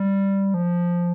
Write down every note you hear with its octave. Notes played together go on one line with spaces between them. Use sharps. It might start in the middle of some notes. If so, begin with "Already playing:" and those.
Already playing: G3
F3